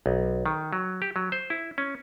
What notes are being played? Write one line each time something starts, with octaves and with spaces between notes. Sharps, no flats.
B1
D#3
F#3
G4
F#3
C5
E4
C#4